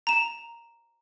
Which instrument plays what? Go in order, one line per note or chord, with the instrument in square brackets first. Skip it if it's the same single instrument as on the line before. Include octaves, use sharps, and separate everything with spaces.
[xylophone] A#5 E7